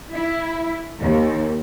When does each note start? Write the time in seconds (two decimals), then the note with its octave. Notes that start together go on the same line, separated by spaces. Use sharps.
0.13 E4
1.00 D#2